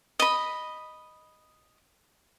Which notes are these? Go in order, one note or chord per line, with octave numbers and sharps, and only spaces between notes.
D#5 B5